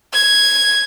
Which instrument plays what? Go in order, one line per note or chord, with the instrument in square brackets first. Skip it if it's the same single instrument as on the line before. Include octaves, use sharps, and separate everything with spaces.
[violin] G#6